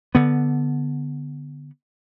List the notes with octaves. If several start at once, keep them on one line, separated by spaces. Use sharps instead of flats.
D3 B3